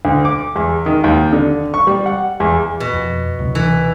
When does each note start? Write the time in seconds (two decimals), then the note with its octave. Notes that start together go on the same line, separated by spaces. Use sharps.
0.05 D2
0.25 D6
0.56 E2
0.86 D#3
1.04 D#2
1.33 D3
1.74 C#6
1.87 G3
2.06 F#5
2.40 E2
2.80 B2
2.93 F2
3.39 D2 C3 F#3
3.55 E3